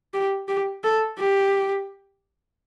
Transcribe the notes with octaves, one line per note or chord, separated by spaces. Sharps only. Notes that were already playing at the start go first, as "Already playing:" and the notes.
G4
G4
A4
G4